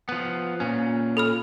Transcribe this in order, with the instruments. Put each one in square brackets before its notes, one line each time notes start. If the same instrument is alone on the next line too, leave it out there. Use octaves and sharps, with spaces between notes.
[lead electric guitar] F3 B3
A#2 C#4
[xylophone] A4 B5 F6